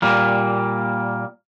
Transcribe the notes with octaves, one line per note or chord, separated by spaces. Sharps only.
A#2 G3 A#3